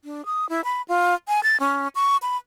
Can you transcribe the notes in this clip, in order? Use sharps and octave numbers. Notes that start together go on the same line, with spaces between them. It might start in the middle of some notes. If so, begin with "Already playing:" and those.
D4
D#6
E4
B5
F4
G#5
A6
C#4
C#6
B5